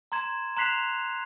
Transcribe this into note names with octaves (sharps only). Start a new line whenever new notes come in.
A#5 C6 G#6 E7
A#5 C6 F#6 B6 C7 F7